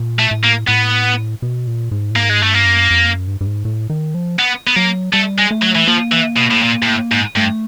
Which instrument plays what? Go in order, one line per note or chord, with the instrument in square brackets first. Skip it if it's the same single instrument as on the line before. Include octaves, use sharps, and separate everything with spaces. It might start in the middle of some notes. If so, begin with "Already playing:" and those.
Already playing: [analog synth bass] A#2
[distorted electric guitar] A3
[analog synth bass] A2
[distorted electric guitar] A#3
[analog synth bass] A2 [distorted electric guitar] B3
[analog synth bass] B2
A#2
G#2
A2
[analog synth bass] G#2 [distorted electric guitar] A#3
[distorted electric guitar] G#3
[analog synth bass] G2 [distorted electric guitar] A3
[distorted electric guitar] A#3
[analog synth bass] F#2
F2
F#2
G2
G2
G#2
A2
D#3
F3
[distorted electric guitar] B3
B3
[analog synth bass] F#3 [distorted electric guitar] A#3
[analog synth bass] G3 [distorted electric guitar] A3
[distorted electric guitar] G#3
[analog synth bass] A3
[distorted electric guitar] F#3
E3
[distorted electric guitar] F3 [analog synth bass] A#3
[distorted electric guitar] E3
B2
A2
A#2
A#2
A2
G#2
[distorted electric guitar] G2 [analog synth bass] A3